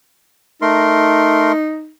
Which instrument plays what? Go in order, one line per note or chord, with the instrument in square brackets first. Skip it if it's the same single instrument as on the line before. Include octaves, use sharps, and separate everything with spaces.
[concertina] A3 A#4 C6 [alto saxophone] D#4